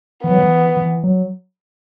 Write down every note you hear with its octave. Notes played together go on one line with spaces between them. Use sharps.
E3 B3
F#3
E3
E3
F#3